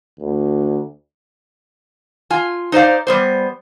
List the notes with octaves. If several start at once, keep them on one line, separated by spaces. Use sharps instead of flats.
D2
F4 G#5
D#4 C5 D5 F5
G3 B3 C5